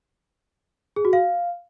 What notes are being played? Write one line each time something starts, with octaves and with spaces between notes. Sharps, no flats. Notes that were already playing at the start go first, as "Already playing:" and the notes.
G#4
F#4
F5